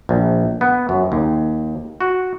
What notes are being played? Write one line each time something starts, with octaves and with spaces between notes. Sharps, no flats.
A#1
B3
F#2
D#2
F#4